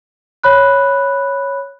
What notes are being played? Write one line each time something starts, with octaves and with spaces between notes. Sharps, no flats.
C#5 B5 F#6